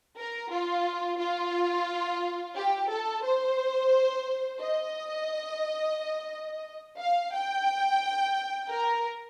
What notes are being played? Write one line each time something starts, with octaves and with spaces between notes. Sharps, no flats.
A#4
F4
F4
G4
A4
C5
D#5
F5
G5
A#4